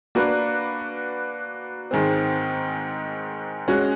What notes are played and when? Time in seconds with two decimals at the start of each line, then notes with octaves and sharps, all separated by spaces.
0.15 A#3 D4 F#4 B4
1.91 G#2 D#3 G#3 C4
3.68 G#3 C#4 F#4